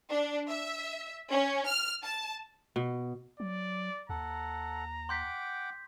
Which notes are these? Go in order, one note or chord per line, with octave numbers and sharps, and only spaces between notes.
D4
E5
C#4
F6
A5
B2
F#3 D5
D#2 A4 F#5 A#5
F#5 G5 C6 D6 G6 B6